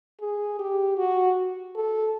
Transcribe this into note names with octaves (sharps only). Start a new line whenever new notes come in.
G#4
G4
F#4
A4